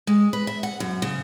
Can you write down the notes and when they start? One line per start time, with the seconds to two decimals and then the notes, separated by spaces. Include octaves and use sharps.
0.07 G#3
0.33 B4
0.47 E5
0.63 F#5
0.80 F#2
1.02 C#3